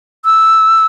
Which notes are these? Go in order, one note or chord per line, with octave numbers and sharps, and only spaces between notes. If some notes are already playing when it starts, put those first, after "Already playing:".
E6